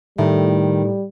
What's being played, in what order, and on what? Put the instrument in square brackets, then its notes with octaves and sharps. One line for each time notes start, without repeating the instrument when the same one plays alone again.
[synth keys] A2 [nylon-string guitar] D#3 [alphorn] G3